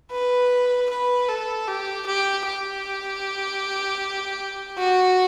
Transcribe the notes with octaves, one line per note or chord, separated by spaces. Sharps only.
B4
B4
A4
G4
G4
G4
F#4